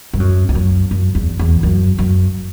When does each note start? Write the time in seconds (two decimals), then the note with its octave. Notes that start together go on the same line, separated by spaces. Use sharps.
0.13 G2
0.20 F#2
0.49 E2
0.55 F#2
0.91 F#2
1.15 E2
1.39 E2
1.63 F#2
1.99 F#2